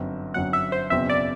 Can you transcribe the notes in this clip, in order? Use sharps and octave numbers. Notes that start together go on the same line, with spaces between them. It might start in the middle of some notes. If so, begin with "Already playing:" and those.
Already playing: G1 F#2 F#3 C4
G1 F#2 F#3 C4 F#5
E5
C5
F#1 E2 B2 F#3 C4 E5
D5